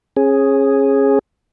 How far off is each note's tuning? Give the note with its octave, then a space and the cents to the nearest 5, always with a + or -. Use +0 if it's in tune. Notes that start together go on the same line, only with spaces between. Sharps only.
C#4 -30 G#4 +0